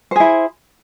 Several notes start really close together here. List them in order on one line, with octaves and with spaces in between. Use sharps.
C5 G#4 E4